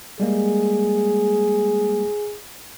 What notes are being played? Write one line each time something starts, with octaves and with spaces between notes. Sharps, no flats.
G3 G#3 A#3 G#4